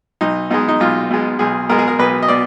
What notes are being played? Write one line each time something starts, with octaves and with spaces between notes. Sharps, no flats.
B1 D#4
B2 G#3 D#4
D#4
B1 F4
B2 G#3
B1 G#4
B2 G#3 A#4
G#4
A#4
B1 B4
D#5
B2 D5